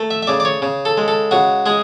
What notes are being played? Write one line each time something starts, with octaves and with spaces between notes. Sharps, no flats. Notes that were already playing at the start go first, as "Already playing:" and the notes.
Already playing: A3
E5
E5
C#3 D5
D5
C#5
C#3
A4
G#3
A4
C#3 F#4
G#3 G#4